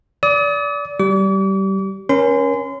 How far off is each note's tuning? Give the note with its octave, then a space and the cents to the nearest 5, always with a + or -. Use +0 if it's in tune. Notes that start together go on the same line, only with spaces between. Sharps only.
D5 -25 D#6 +35
G3 -20 D6 -40
C#4 +0 A#4 +35 C6 -35